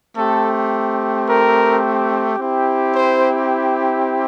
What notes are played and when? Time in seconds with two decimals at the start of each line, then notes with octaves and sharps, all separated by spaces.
0.16 A3 C4 G4 A4
1.27 A#4
2.39 C4 E4 G4
2.94 C5